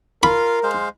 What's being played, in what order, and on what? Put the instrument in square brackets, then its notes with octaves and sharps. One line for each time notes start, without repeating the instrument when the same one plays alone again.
[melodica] F4 F5 [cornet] A#4 [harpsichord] B5
[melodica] G#3 C5 F5